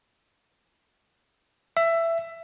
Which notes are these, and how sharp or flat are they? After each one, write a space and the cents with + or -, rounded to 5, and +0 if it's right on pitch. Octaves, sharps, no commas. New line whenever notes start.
E5 +15